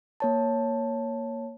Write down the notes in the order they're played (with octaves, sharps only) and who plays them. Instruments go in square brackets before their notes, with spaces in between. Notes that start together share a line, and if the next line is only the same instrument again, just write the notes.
[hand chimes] A#3 C#5 A5